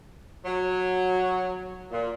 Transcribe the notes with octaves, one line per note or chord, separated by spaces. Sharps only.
F#3
A#2